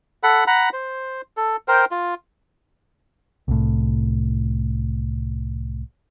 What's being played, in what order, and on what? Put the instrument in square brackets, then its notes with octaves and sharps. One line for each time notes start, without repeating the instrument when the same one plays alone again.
[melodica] A4 F#5 B5
F#5 A#5 B5
C5
A4
A#4 C5 G5
F4
[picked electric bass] C2 A2